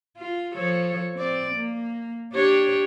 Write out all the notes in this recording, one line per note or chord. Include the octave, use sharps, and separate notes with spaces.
F4
F3 A4 C#5
C4 D5
A#3
D4 G4 C#5